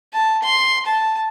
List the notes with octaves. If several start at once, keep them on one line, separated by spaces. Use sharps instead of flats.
A5
C6
A5